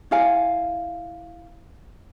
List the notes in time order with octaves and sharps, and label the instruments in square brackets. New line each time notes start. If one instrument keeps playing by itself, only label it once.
[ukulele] E4 F5 G#5